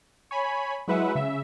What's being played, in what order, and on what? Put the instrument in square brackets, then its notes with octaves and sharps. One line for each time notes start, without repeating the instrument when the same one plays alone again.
[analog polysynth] C#5 G#5 B5
F#3 G#3 E4 B4 E5 F#5
C#3 E5